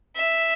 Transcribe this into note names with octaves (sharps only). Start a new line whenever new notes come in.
E5